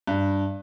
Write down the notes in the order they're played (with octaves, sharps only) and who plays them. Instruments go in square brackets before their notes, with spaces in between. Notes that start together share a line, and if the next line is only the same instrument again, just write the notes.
[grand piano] G2